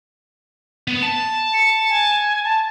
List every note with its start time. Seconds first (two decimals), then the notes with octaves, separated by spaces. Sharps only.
0.88 B3
1.03 A5
1.53 C#7
1.89 G#5
2.44 A5